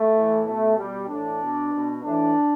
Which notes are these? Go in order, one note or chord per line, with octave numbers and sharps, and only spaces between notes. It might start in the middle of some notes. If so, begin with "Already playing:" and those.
Already playing: A3
A2 E3
B2 A3
B2 G3
A2 D4
E3
B2
B2
A2 E3 D4